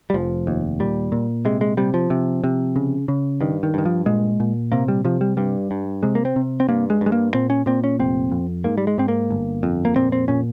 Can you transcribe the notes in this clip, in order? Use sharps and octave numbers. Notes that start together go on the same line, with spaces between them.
G3
F1 F3
D#2
A#2 G3
A#2
C3 G#3
G#3
C3 G3
F3
C3
C3
C#3
C#3
G2 D#3
D#3
G2 D#3
F3
A#2 G#3
A#2
C3 A#3
G3
C3 F3
G3
G2 G3
G2
C3 G#3
A#3
C4
C3
C4
G2 A#3
G#3
G2
G#3
A#3
A#2 C4
C#4
A#2 C4
C#4
F1 C4
F2
G#2 A#3
G3
G#3
G#2 C4
A#3
G1
F2
A#3
A#2 C4
C4
A#2 C#4